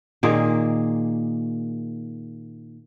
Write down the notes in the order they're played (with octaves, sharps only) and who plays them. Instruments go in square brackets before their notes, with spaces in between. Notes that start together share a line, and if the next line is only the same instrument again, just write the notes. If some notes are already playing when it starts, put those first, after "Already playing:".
[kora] A#2 D#3 A#3 G#4